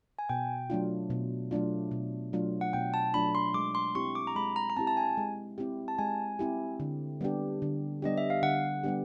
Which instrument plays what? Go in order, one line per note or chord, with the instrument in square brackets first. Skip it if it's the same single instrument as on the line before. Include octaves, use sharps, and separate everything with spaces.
[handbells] G#5
[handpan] B2 [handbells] G5
[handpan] F#3 A3 D4 F4
B2
F#3 A3 D4 F4
B2
F#3 A3 D4 F4
[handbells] F#5
[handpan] B2 [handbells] G5
[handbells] A5
[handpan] F#3 A3 D4 F4 [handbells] B5
[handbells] C6
[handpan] G#3 [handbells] D6
[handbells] C6
[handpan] C4 E4 G4 [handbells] C#6
[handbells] D6
A#5
[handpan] G#3 [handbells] B5
[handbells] A#5
A#5
[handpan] C4 E4 G4 [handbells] A5
[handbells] A5
G#5
[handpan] G#3
C4 E4 G4
[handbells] A5
[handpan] G#3 [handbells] G#5
[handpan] C4 E4 G4
D3
G3 B3 D4 G4
D3
[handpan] G3 B3 D4 G4 [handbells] D#5
[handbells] E5
F5
[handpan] D3 [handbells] F#5
[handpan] G3 B3 D4 G4